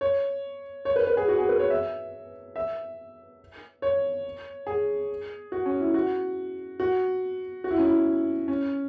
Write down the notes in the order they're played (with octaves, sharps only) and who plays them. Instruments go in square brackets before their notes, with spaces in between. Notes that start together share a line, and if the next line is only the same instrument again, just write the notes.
[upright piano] C#5
C#5
B4
B4
G#4
F#4
G#4
B4
C#5
E5
E5
C#5
G#4
F#4
C#4
E4
F#4
F#4
F#4
E4
C#4
E4
C#4